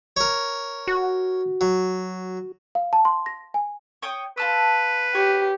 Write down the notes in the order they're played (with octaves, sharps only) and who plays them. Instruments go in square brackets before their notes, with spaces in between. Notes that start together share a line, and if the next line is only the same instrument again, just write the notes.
[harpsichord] A#4 C#5
[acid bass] F#4
[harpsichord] F#3
[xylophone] F5
A5
C6
A#6
G#5
[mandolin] C#5 G5 D#6
[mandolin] F4 A5 E6 [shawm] B4
[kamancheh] G4 [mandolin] C#5